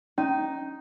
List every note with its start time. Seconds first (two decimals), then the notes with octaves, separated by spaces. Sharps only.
0.18 C#4 D#4